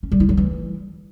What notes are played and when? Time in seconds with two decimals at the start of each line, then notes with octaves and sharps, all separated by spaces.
0.03 C#4
0.12 G3
0.20 E4
0.29 F#3
0.37 E3